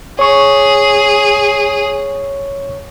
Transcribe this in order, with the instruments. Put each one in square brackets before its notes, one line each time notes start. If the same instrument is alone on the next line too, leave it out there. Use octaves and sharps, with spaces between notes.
[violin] G#4 [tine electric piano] C#5 C#6